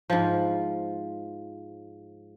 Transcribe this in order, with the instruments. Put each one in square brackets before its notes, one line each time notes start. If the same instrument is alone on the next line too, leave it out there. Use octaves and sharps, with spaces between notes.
[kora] G#2 F3